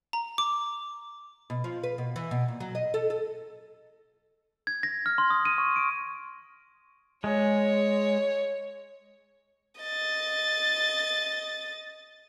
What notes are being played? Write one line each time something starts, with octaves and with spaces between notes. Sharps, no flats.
A#5
D6
B2
F3
B4
B2
E3
B2
A#2
F#3
D#5
A4
A4
G#6
A#6
F6
C6
D#6
D#7
C#6
D7
G#3 C#5
D#5 A6